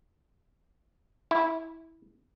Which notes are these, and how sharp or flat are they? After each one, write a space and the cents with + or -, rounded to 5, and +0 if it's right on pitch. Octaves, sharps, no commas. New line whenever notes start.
E4 -15